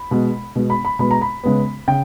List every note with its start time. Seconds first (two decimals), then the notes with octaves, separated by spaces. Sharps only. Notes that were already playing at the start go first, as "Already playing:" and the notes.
Already playing: B5
0.11 B2 G#3 B3
0.55 B2 G#3 B3
0.70 B5
0.85 B5
0.99 B2 G#3 B3 B5
1.11 A#5
1.21 B5
1.43 C#3 G#3 B3
1.88 C#3 G5